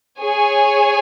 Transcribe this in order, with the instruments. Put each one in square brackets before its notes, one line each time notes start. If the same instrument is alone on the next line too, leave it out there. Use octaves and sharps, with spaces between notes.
[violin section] G#4 C#5 G#5